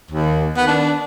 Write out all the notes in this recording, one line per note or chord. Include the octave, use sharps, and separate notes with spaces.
D#2
D#3 B3
D4